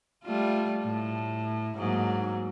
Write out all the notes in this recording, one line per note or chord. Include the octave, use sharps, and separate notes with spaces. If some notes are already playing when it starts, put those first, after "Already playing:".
G3 A3 F4
A2
G#2 F#3 A#3